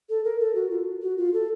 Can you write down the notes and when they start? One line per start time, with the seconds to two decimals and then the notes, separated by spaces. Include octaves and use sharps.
0.10 A4
0.25 A#4
0.40 A4
0.55 F#4
0.71 F4
1.02 F#4
1.18 F4
1.34 A4